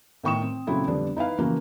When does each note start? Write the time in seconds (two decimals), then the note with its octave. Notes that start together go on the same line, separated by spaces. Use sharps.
0.24 A2 D#3 G5 C#6 D#6 E7
0.42 C4
0.67 A#2 C#3 F#3 C4 E4 A4
0.88 F2 D3 G3 B3 D4
1.17 D#4 E4 B4 F5
1.38 C#3 E3 F3 A#3 F#4